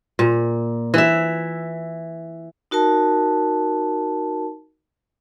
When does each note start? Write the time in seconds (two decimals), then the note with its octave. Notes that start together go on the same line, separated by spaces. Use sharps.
0.19 A#2
0.94 E3 E5
2.71 D#4 F#4 A#4 A5